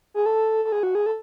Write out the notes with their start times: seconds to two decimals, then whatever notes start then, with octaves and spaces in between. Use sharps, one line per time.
0.14 G#4
0.26 A4
0.65 A4
0.72 G#4
0.83 F#4
0.95 G#4
1.06 A4